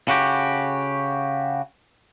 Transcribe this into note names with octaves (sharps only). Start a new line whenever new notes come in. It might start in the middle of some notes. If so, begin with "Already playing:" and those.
C#3 F#4 G4